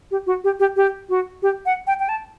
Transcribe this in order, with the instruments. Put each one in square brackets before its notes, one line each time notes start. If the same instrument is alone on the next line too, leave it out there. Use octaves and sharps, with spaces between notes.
[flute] G4
F#4
G4
G4
G4
F#4
G4
F#5
G5
G5
A5